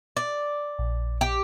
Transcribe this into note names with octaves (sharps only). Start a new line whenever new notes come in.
D5
A#1
G4